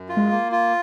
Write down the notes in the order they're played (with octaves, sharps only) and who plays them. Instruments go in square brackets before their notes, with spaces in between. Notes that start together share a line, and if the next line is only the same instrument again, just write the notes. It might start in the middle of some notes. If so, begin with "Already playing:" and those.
Already playing: [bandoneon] F#2
F4
[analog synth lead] G#3
[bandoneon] A#3
F4